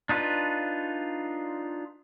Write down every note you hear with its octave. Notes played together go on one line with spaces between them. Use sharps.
D4 D#4 F4 B4